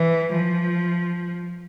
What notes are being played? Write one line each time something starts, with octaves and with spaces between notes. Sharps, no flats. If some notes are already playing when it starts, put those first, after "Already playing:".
Already playing: E3
F3